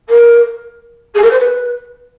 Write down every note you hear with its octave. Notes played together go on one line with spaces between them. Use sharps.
A#4
G#4
A#4
C5
B4